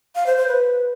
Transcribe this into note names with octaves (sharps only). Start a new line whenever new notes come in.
F5
C5
C5
B4